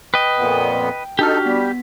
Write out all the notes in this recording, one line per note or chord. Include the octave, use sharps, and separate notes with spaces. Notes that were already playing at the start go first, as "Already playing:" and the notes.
B4 D#5 G5
F2 A#2 B3
D4 D#4 F#4 G4 A4 F6
G3 B3 B6